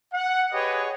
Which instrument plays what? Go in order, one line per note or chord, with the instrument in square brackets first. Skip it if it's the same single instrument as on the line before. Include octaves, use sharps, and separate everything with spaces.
[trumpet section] F#5
G4 G#4 B4 C#5 D#5